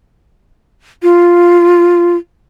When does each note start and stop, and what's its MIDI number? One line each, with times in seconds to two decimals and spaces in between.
1.03 2.16 65